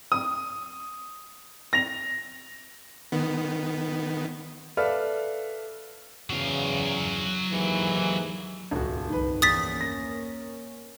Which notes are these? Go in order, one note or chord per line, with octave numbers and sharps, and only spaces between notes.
D#6
A#6 F7
D#3 B3
A4 B4 D5 E5 F5 F6
E2 C#3 F#3 F5
D#2 G#2 E3
D#1 C#2 G2 A#2 F#4
G1 C2 F2 D#3 B4
E2 A#3 C#4 D#6 A6 B6
A#6